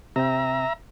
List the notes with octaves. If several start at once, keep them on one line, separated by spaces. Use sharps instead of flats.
C3 C4 E5 G5 A#5